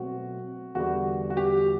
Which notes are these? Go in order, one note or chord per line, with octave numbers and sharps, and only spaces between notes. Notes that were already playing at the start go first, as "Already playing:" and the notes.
Already playing: B2 F#3 A3 C4 F#4
E2 D3 G3 F#4
F#4
G4